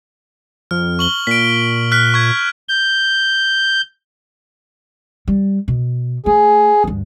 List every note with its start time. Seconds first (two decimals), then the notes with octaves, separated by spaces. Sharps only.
0.71 F2 F6
0.99 C#6 F#7 G7
1.27 A#2 B6 D7
1.92 F6 F#6 B6
2.14 C#6 G#6
2.69 G6
5.28 G3
5.68 B2
6.26 A3 G#4
6.84 D2 G2